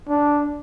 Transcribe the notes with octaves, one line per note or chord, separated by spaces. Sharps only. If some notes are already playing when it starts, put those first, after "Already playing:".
D4